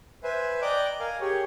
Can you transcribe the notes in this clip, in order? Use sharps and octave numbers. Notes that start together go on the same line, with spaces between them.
B4 C5 E5 G#5
D5 D#5 G5 A#5 D6 F#6
A#4 F5 G#5
G4 G#4 C#5